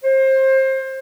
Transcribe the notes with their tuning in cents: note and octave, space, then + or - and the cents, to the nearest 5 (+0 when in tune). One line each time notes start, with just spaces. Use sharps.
C5 +25